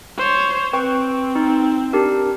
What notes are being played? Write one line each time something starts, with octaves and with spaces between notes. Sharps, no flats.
C5 C#5
C4 B4 G5 C#6
D#4
D4 G4 A#4